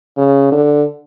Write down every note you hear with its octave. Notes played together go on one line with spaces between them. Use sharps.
C#3
D3